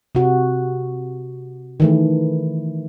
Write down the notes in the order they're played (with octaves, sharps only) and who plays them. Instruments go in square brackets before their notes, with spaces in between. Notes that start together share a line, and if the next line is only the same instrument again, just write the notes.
[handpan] C3 F#4
D#3 E3 A3